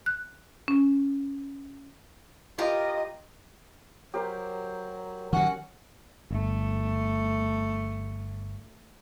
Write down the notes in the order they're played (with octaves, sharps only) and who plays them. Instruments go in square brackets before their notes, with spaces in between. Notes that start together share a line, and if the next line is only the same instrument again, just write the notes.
[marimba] F#6
C#4
[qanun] F4 G4 A#4 [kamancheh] D#5
[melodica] F#3 [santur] G4 A#4 C5
[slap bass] D#3 F#3 [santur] C#4 [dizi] F#5
[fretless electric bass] G1 [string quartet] A3